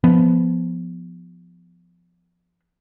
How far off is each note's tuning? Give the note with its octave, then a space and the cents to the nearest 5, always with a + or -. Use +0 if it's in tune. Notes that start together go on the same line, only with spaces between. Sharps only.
F3 +0 B3 +0